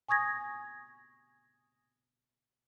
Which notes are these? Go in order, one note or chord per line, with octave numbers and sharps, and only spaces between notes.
G#5 C#6 D#6 G#6 A#6